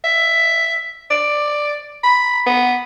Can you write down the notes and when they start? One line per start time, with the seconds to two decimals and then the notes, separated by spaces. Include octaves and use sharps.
0.04 E5
1.11 D5
2.03 B5
2.47 B3